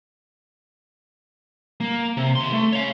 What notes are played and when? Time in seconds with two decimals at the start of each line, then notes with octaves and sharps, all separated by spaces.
1.80 A#3
2.17 C3
2.35 D#2 C6
2.53 A3
2.72 C#5 F5